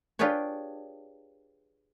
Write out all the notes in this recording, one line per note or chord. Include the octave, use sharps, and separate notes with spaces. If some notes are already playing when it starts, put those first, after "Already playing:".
D4 F4 G4 G#4 B4 C#5